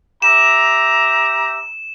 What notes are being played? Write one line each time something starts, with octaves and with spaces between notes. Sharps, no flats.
G4 E5 A#5 E7